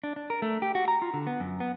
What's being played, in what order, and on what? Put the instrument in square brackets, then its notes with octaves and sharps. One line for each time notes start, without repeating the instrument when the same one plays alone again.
[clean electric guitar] D4
D4
A#4
A3
G4
F#4
A#5
F4
D3
B3
F#2
B3